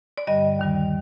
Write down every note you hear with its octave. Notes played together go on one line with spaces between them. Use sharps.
D5
G2 D3 G3 D#5
D#2 D#3 G3